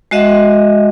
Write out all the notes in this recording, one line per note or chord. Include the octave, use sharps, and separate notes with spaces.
G#3 F#4 D#5 E5 F#5